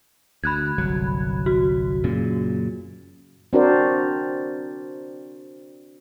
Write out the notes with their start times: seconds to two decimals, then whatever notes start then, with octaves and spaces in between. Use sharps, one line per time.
0.44 D2 B5 F#6 G#6
0.78 G1 C2 F#3
1.46 F#4
2.04 F#2 A#2 C#3
3.53 C4 D4 F#4 A#4 C5 D5